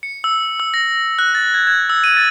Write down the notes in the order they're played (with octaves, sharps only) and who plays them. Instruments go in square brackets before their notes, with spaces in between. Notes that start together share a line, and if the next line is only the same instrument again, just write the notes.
[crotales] C#7
E6
E6
A#6
F#6
A6
G#6
G#6
E6
D#7
A6